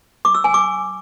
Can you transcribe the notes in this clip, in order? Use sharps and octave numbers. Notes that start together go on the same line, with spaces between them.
D6
E6
G#5
D6